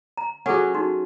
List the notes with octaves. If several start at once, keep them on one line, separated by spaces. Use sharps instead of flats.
A#5
F#3 C#4 G#4 A4 F#5
D#4 F#4